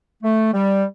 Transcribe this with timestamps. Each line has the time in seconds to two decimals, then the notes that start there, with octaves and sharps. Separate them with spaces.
0.23 A3
0.53 G3